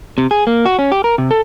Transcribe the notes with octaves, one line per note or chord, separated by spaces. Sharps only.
C3
G#4
A#3
F#4
C#4
G4
A#4
C3
A4